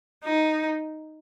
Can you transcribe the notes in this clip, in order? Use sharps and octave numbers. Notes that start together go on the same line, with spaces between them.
D#4